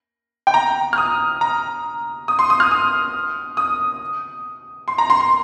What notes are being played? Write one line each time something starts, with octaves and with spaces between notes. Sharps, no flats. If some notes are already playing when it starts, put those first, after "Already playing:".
G5
A#5
F6
D#6
A#5
D#6
C6
D#6
F6
D#6
D#6
C6
A#5
C6
C6